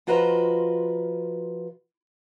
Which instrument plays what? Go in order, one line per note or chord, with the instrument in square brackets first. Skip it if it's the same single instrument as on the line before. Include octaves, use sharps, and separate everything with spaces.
[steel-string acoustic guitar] F3 F4 F#4 B4 D#5 A#5